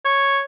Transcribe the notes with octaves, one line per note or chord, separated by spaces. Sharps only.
C#5